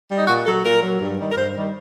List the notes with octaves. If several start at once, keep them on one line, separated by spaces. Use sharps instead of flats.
G3
D#4
A#2 F#4
F#3 A4
A#2 A#4
F#3
G2
D#3 G3
A#4
G2 C5
D#3 G3